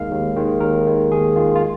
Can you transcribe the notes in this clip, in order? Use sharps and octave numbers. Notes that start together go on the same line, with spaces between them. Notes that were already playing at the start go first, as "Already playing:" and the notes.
Already playing: D#2 D#3 G#3 F5
D#2
D#3 G#3
D#2 A#4
D#3 G#3
D#2 G#4
D#3 G#3 F4
F4